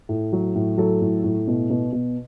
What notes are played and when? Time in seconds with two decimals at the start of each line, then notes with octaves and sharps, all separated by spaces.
0.09 A2
0.33 F#3
0.55 A2
0.78 F#3 A4
1.01 A2
1.24 A2
1.48 B2
1.70 B2
1.92 B2